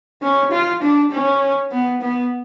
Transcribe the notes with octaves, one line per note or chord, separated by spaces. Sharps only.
C#4
F4
D4
C#4
B3
B3